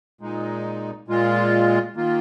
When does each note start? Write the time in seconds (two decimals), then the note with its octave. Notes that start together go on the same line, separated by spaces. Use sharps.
0.21 A#2 G#3 D#4
1.08 A#2 G#3 F4
1.97 D#3 A#3 F4